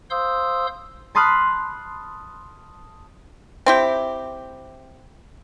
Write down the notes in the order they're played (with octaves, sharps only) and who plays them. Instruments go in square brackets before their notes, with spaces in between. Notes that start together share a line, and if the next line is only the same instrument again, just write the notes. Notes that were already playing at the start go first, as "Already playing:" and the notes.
[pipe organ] C5 F5 C6 D#6 E6 G6
[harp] A5 B5 C6 D#6 F6 F#6
[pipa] C4 E4 G4